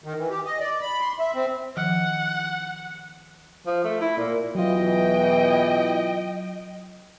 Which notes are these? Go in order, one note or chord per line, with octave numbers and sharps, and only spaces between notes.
D#3
E3
G4
D#5
D5
B5
C6
E5
C4
D#3 F3 F#5 F6
F3
A3
E4
A#2
E2 B2 E3 F#3 F4 D#5 G5